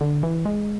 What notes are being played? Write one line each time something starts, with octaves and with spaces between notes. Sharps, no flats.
D3
E3
G#3